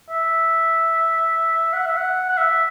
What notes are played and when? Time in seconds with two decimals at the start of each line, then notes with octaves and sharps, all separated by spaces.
0.10 E5
1.73 F#5
1.86 E5
1.97 F#5
2.29 F#5
2.37 E5